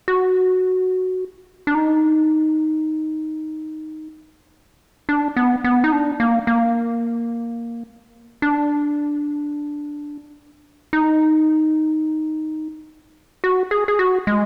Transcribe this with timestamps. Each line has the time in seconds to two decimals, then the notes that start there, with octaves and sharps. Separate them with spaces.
0.08 F#4
1.67 D4
1.75 D#4
5.09 D4
5.36 B3
5.64 B3
5.84 D#4
5.92 D4
6.20 A#3
6.47 A#3
8.42 D4
10.93 D#4
13.44 F#4
13.71 G#4
13.88 G#4
13.99 F#4
14.27 G#3